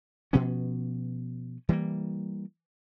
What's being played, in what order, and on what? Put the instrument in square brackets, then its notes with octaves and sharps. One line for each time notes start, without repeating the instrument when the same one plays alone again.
[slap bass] B2 F3 B3 C#4
E3 G3 G#3 A#3